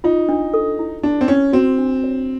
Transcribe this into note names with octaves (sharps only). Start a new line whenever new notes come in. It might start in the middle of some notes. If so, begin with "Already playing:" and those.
D#4 F4
D4
A4
E4
D4 G4
C4
C#4 E4
C4 F#4
D4
C#5